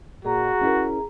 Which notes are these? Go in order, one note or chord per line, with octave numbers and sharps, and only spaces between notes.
A#2 F#4 G#4 A#5
C#4 E4 A#4